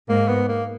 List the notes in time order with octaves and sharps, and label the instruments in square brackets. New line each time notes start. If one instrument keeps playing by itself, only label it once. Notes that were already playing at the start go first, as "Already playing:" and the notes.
[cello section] G#2 [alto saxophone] A#3
[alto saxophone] B3
A#3